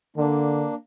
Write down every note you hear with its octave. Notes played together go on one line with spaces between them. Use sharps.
D3 A#3 D4